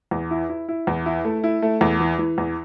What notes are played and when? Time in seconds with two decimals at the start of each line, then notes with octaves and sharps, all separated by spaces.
0.11 E2
0.31 E4
0.49 E4
0.69 E4
0.87 E2
1.06 E4
1.25 A3
1.44 E4
1.62 A3
1.81 E2
2.00 E3
2.19 E3
2.38 E2